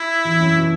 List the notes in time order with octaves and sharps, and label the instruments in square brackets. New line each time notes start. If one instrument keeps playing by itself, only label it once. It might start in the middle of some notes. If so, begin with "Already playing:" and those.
Already playing: [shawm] E4
[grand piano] E2 E3
F#2 F#3
B2 B3